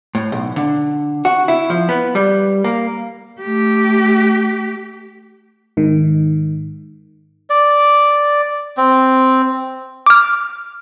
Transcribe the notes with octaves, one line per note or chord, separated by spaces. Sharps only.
A2
B1
D3
F#4
E4
F3
B3
G3
A#3
A3 G4
G#2 D#3
D5
C4
D6 F6